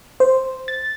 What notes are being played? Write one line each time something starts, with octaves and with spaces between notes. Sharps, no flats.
C5
A6